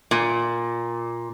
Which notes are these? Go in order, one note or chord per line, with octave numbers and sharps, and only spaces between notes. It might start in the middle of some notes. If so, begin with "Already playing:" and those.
A#2